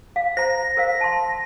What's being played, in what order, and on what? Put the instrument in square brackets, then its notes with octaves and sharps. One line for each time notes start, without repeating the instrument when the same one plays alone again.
[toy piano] F5
[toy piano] C5 A#5 [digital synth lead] A#6
[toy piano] A#4 C5 F5
A5 C6